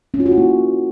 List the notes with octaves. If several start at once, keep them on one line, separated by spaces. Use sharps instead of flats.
C#4
F4
F#4
E4
A#3